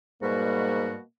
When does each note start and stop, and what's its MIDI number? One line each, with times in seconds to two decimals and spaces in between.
0.22 0.95 44
0.22 0.98 47
0.22 0.98 55
0.22 1.04 58
0.22 0.98 66